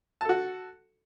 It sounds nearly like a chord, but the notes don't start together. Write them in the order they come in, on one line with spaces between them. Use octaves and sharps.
A5 A4 F#4